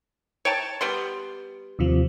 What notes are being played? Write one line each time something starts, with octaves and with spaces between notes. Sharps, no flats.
C#5 G5 A5
G3 B3 C6
D#2 C3 F3